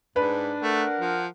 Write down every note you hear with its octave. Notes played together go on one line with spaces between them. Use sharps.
G#2 D4 B4
A3 A#4 F#5
F3